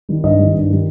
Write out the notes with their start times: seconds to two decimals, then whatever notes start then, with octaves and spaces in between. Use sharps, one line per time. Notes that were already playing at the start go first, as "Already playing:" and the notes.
0.09 D#3 G3
0.24 G2 D#5
0.39 D#3 G3
0.54 G2
0.70 D#3 G3